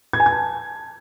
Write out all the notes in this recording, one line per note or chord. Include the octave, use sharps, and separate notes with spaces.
G#6
G#5
G#6
A5